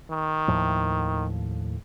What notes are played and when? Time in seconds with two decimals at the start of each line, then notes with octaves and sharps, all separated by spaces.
0.10 D#3
0.48 D#2 A2 F3